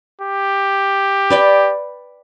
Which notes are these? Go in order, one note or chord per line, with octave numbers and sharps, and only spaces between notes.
G4
B4 D5 G5